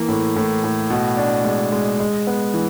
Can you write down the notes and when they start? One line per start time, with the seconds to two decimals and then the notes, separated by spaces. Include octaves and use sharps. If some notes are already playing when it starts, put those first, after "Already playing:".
Already playing: E3 A#3
0.08 A2
0.36 A2
0.64 A2
0.90 B2
1.17 D4
1.44 G#3
1.72 G#3
2.00 G#3
2.27 B3
2.54 E3